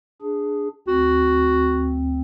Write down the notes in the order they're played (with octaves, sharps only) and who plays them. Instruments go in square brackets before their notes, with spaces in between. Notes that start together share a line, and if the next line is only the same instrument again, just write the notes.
[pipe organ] D4 G#4
[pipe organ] D2 C4 [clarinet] F#4